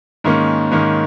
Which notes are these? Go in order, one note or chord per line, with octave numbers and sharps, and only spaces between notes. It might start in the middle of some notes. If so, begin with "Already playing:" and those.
G#2 D#3 A#3 C#4
G#2 D#3 A#3 C#4